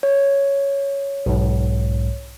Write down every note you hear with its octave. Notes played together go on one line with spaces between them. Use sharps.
C#5
B1 G#2